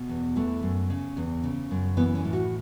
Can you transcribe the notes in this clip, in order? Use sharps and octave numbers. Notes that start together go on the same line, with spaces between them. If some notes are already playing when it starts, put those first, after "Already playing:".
Already playing: B2
E2
E3 A3
F#2
C#3
E2
C#3
F#2
E3 B3
C#4
A2
F#4